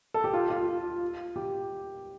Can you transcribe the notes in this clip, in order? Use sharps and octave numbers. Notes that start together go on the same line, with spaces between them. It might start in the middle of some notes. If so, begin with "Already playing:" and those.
A4
G4
F4
F4
G4